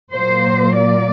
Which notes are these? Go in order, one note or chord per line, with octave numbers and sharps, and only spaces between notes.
A#2 F#3 A#3 C5
D5